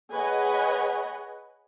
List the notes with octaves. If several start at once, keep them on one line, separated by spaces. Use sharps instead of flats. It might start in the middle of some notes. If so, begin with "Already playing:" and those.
G#4 B4 C#5 D#5 F#5 G#5